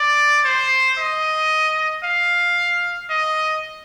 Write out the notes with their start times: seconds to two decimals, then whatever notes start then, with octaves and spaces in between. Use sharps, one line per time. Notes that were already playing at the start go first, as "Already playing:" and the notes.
Already playing: D5
0.45 C5
0.99 D#5
2.04 F5
3.10 D#5